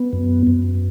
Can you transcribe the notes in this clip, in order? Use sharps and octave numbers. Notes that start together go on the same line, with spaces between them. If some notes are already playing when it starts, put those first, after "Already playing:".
Already playing: B3
F#2
F#2